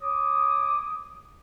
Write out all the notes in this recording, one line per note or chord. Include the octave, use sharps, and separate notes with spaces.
C#5 D6 D#6